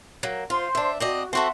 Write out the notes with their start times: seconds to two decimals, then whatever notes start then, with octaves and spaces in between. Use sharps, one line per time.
0.23 F#3 A#3
0.50 F4 C5 C6
0.75 D4 E5
1.00 C4 F#4 D5 D#5
1.33 C4 F#4 A4 E5 F#5 C6